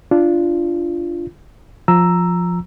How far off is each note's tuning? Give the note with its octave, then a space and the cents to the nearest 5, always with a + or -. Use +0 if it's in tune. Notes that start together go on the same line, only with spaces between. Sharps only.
D4 +0 F4 -20
F3 +10 A#5 +0 E6 +5